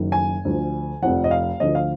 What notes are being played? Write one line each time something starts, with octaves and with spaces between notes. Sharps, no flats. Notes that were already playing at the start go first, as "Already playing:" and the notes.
Already playing: F#1 F#2 D#3
G#5
D2 D3 F3
F1 F2 F3 F#5
D#5
F5
D2 D3 F3 D#5
F5